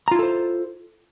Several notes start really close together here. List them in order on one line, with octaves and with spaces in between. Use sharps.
A#5 F4 E4 A4 C5